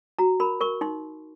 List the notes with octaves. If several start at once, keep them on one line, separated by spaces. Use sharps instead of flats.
F#4 A#5
A#4 B5
A#4 C#6
D#4 C6